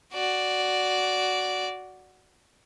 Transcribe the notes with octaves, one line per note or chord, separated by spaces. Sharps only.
F#4 D5